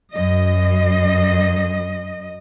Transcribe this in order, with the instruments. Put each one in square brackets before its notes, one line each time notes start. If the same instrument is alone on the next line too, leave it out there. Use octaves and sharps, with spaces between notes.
[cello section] F#2 D#5